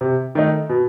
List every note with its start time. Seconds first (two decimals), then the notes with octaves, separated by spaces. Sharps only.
0.01 C3
0.35 D#3 A3 D#4
0.69 B2